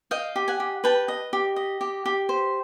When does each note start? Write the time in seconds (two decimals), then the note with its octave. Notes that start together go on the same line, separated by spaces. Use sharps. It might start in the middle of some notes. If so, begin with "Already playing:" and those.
0.11 D#5 F5 G5
0.36 G4
0.48 F#5 G#5
0.60 G4
0.84 B4 G5 A5
1.08 D#5
1.33 G4
1.56 D#5
1.81 G4
2.06 G4
2.29 C5